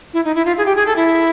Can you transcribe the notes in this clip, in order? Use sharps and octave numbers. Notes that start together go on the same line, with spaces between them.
E4
D#4
E4
F4
G#4
G4
G#4
A4
E4